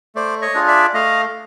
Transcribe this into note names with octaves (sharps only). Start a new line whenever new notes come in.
A3 C5 D5
C#5 D#5
D4 F4 G#4
D5 E5
A3 D#5 F5